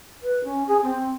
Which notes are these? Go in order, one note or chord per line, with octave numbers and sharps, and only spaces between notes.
B4
C#4
G#4
C4